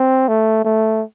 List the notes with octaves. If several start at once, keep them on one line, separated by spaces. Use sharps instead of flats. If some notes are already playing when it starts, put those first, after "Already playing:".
Already playing: C4
A3
A3